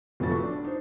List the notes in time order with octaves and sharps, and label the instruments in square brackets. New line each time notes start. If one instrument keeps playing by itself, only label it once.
[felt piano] F1 F2 F3 A3 F#4 A6
C#6
D4
D#4 C5